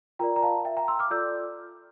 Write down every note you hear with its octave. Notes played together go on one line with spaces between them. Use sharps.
F4 A#4 D5 G5 A#5
A#5
F5 A5
E5 G5
G5 A#5
C6 E6
D6 F6
F4 A4 D5 E6 G6